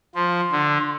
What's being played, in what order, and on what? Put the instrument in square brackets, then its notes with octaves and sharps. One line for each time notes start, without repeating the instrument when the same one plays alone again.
[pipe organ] F3 [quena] C6
[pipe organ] D3